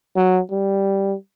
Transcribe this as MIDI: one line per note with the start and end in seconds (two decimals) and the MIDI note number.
0.16 0.40 54
0.51 1.15 55